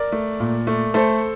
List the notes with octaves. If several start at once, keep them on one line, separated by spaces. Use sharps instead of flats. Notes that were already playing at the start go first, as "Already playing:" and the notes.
Already playing: A#4 D5
A3
A#2
A3
A3 A4 C5